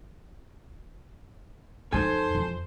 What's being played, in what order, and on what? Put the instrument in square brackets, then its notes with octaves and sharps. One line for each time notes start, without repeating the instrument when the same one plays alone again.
[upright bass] F2 D#4 [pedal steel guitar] A4 G#5 [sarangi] C5
[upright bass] F2